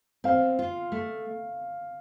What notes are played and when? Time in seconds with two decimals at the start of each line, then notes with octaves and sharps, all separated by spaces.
0.24 C4 F5
0.59 F4
0.92 A3